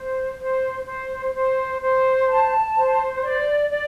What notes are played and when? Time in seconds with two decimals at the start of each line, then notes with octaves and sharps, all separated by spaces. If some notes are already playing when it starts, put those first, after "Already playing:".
Already playing: C5
0.39 C5
0.86 C5
1.34 C5
1.81 C5
2.28 A5
2.75 C5
3.22 D5
3.70 D5